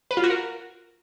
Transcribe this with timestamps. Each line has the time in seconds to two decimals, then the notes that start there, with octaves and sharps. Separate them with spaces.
0.11 B4
0.17 F4
0.24 F#4
0.30 A#4